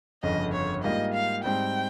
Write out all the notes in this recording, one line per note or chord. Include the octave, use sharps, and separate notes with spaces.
G1 F2 C#3 D#5
C#5
G#2 G3 A#3 F4 D#5
F5
G#2 G3 C4 G5